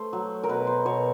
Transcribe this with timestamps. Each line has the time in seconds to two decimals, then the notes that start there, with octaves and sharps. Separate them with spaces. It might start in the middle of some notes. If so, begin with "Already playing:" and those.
Already playing: A3 C5
0.13 F#3
0.44 A#4
0.49 B2 B4
0.67 C5
0.86 B2 C#5